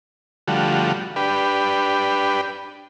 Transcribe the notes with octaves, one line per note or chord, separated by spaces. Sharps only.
D3 F3 G3 A3 F#4
D4 G4 B4